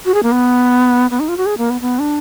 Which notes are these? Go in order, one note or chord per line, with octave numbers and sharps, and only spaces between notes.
F#4
G#4
A#3
B3
B3
D#4
F4
F#4
G#4
A#3
B3
B3
D4